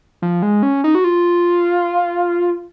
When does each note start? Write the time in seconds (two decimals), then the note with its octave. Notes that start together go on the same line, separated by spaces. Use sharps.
0.22 F3
0.42 G#3
0.63 C#4
0.84 D#4
0.95 F#4
1.04 F4